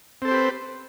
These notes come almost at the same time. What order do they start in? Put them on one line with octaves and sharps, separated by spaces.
C4 A4 C5 G4 B4